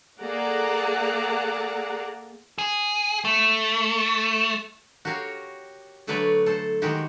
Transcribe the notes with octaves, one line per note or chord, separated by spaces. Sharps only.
A#3 G#4 A4 D5 F#5 A#5
G#4
A3
F#4 G4 A#4 C#5 F5
D3 F#3 A3 B4 C#5 D5
A4 C5
D#3 G#3 F#4 G4